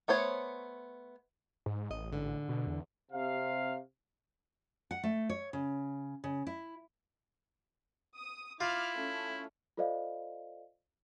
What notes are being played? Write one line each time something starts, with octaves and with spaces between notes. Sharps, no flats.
A3 B3 C5 C#5
G#2
A1 D#5
G#2 D3
B2
E2
C3 F5
F#5
A3
C#5
C#3
C#3
E4
D#6
E4 F4 D6 F6
A3 C#4
F4 A4 C5 D5 D#5 F5